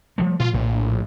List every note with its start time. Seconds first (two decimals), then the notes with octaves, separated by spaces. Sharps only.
0.18 F3 G3 A3
0.40 A#2 F4
0.54 A#1 A2